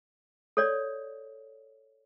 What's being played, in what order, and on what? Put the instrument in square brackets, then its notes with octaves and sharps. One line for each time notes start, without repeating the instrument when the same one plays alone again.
[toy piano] A4 C#5 D5